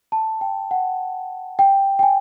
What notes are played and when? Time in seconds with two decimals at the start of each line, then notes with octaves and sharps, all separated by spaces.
0.12 A5
0.41 G5
0.71 F#5
1.59 G5
1.99 G5
2.03 G#5